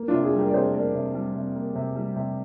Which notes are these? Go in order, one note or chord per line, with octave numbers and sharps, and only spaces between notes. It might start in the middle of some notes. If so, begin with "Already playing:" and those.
Already playing: A#3
D4 F4
C3
F4 G#4
G3 G4 A#4
D5
C3 G#4 C5
A#3 A#4 D5
C3
G3
C3
A#3
C3
G3
C3